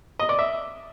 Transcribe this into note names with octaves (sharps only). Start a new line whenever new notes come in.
D#5
D5
E5